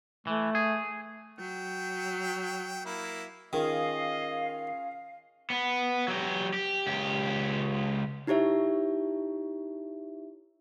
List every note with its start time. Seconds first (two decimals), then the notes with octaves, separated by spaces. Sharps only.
0.27 E3 A3
0.55 G#4
1.39 F#3 G5
2.85 A#3 E4
3.53 D#3 C#4 F4 G#4 D#5 F5
5.50 B3
6.08 F#3 G4
6.53 G4
6.87 C#2 G4
8.27 D#4 E4 G4 C#5 E5